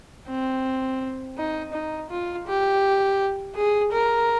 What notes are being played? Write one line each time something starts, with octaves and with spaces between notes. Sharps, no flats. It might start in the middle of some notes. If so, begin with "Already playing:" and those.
C4
D#4
D#4
F4
G4
G#4
A#4